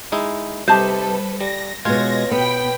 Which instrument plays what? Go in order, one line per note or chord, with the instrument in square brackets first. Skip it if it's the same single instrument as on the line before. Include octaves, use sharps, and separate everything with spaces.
[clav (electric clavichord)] G#3 D#4 E4
[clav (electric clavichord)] C3 D#4 G4 [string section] G3 A4 B4 [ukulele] C5 A5
[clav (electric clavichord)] G3 [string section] A#6
[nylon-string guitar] B2 G#3 [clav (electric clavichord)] F4 [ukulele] C#5 [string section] G#6 A#6
[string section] B2 G5 B5 [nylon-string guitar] B3